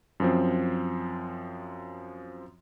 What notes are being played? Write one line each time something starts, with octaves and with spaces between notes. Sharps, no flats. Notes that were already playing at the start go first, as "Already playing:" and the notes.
F#2 F3 C4